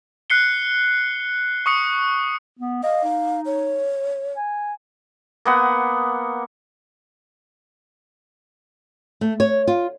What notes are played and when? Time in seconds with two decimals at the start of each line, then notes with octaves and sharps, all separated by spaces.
0.30 F#6 C7 C#7 G7
1.66 C#6 D#6 C#7
2.59 B3
2.83 D#5 F5
3.04 D#4
3.46 C#5
4.36 G#5
5.45 A#3 B3 F#5
9.21 A3
9.40 C#5
9.67 F4